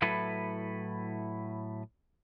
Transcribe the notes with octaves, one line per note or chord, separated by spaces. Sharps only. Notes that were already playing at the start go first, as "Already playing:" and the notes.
A2 F#3 E4 A4 B4